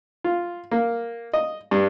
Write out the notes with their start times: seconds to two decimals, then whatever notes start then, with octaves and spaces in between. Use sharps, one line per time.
0.24 F4
0.71 A#3
1.33 D#5
1.71 G2